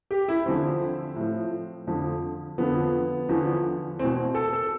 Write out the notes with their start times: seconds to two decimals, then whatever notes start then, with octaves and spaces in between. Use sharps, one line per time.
0.11 G4
0.28 E4
0.45 E2 D3 F3 C4
1.16 A2 F3
1.87 F2 D3 F3
2.58 F2 D3 F3 B3
3.29 E2 D3 F3
3.99 E2 B2 C4
4.35 A4
4.53 A4